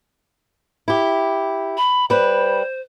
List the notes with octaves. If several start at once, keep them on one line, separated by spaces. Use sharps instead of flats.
E4 G4
B5
G3 B4 C5